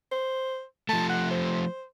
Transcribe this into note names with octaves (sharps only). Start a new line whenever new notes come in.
C5
F3 A3 A5
F#5
C5